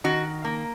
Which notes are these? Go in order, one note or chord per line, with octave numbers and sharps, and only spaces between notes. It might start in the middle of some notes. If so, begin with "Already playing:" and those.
D#3 F#4
A#3